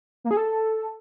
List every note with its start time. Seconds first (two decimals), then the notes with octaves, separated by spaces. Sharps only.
0.24 A#3
0.31 G#4
0.37 A4